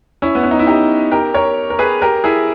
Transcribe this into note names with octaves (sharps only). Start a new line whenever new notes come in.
C#4 E4
B3
C#4
D#4
E4
D#4 G4
G4 A#4
A#4 C#5
A#4
G#4 B4
G4 A#4
E4 G#4